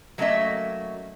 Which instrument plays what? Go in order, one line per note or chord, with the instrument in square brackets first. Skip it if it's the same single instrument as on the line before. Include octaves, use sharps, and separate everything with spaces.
[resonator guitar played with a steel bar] F#3 A3 A#3 C#4 D#5 E5